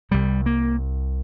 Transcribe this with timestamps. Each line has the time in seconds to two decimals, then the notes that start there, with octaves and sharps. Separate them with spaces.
0.11 C2 C3 G3
0.46 A#3